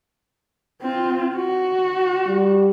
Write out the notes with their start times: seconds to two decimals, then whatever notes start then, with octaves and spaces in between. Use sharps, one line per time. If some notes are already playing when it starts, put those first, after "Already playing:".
0.81 C4 F4
1.36 F#4
2.27 G3